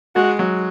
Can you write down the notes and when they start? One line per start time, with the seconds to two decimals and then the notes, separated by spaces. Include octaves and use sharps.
0.15 G#3 F#4
0.39 F#3